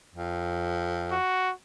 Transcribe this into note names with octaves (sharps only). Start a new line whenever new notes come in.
F2
F#4